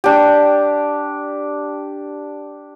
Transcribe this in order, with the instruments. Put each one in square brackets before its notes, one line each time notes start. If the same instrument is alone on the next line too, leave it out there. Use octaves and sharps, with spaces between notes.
[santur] D4 G4